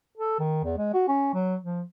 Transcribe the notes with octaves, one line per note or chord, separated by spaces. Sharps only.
A4
D#3
E2
G#3
F#4
C#4
F#3
F3